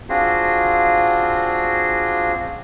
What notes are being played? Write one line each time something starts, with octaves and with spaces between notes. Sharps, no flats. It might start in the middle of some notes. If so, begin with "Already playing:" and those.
C4 D4 F4 F#4 G#4